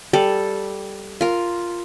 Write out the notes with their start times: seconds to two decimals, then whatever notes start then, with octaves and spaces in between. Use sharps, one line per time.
0.13 G3 A4
1.21 F4 A#4